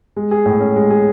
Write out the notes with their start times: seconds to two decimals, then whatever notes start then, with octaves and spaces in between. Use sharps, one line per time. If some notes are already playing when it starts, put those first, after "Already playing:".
0.16 G#3
0.31 G#4
0.46 A2
0.60 C#4
0.76 G#3
0.90 G#4